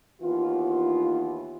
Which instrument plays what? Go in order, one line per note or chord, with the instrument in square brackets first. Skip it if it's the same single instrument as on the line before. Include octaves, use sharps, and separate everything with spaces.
[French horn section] D#2 E3 B3 F4